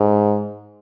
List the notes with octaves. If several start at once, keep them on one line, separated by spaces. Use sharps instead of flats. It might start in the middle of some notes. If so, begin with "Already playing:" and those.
Already playing: G#2